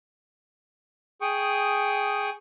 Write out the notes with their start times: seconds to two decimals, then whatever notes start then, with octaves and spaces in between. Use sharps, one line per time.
1.21 G#4 G5 C#6 D#6